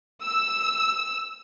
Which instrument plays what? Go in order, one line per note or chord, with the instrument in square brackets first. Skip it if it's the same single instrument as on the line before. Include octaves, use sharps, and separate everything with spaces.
[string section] E6